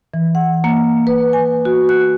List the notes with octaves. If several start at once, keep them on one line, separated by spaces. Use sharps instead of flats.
E3
F#5
A#3
B4
G#5
F#4
F#6